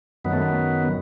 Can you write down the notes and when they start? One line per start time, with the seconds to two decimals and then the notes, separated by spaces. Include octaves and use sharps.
0.25 F#2 D#3 F#3 B3
0.33 A3
0.41 B3